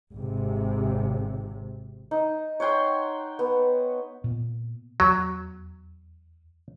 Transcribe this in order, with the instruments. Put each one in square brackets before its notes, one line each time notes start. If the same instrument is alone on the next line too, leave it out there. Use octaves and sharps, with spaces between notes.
[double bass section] G#1 C3
[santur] D#4
C#5 F#5 G5 C6
B3
[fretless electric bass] A#2 B3
[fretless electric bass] E2 [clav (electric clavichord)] F#3